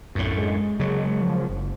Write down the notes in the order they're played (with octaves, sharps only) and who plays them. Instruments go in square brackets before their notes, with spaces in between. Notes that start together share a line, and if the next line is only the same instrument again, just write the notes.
[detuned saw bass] B1 [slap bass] F#2 A2
[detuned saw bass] G#3
[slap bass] C#3 F#3
[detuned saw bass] F3
F#1